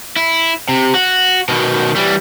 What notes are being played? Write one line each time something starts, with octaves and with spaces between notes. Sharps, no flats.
E4
C3
F#4
B2 D#3
E3 G3